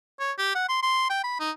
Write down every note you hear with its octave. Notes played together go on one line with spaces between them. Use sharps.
C#5
G4
F#5
C6
C6
G5
B5
D#4